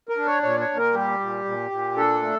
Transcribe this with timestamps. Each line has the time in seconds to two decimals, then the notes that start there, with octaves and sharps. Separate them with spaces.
0.09 A#4
0.17 D4
0.26 C#5
0.43 A#2 C#5
0.60 C#5
0.69 A#2
0.77 A#4
0.94 G3 G4
1.20 A#2
1.45 A#2
1.71 A#2
1.96 D4 A4
2.22 A3